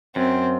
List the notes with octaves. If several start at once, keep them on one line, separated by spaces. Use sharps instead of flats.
F#2 C4